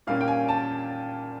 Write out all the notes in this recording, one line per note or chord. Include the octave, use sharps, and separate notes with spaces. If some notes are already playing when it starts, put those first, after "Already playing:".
A#2 G3 A#3 C#4 F5
G5
G#5
A5